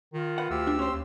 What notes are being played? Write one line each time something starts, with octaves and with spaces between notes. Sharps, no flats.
D#3 F4
B4 F#5
D2 G4 E6
D4
C#4 C5 C6
D#2